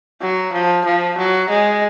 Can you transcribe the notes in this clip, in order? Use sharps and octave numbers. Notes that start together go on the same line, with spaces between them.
F#3
F3
F3
F#3
G#3